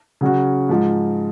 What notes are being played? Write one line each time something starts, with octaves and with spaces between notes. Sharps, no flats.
C#3 F#3 C#4 F#4
G#2 F3 G#3